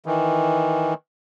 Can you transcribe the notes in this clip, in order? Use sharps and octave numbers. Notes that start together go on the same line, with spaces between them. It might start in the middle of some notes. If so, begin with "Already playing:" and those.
D#3 E3